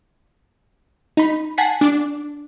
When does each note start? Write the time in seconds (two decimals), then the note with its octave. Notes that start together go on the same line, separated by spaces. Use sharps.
1.17 D#4 B5
1.58 F#5 G#5 A5 B6 C7
1.81 D4 D6